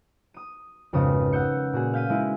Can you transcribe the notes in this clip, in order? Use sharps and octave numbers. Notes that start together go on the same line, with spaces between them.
D#6 D#7
G#1 F2 C#3 B3 D#6
F#5 E6 G6 C#7
A#2 F#4 G#4
F5 G6 B6 D#7
G#3 E4